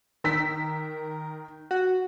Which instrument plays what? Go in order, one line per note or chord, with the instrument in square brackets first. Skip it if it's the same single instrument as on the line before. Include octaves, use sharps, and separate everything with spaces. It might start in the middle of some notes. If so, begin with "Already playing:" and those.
[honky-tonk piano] D#3 E6 B6 [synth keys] A#4
[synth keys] F#4